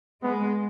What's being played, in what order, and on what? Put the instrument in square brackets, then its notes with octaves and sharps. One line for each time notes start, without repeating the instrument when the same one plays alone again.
[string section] G#3 [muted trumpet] B3